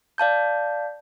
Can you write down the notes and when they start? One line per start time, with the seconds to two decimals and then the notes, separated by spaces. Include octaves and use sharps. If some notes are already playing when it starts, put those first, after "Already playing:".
0.18 D5 F5 A5 G6